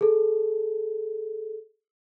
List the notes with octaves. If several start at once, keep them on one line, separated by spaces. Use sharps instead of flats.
G#4 A4